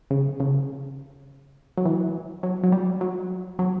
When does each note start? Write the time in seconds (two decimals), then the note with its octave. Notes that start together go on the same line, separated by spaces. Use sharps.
0.10 C#3
0.40 C#3
1.78 F#3
1.85 E3
2.43 F#3
2.64 F#3
2.72 G3
3.01 F#3
3.59 F#3